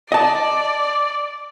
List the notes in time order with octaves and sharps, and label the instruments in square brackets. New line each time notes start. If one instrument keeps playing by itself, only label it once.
[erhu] D5 [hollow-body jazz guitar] D#5 A5